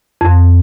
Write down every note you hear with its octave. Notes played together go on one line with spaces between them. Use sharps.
F2